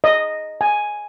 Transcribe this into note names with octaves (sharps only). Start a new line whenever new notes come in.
D#5
G#5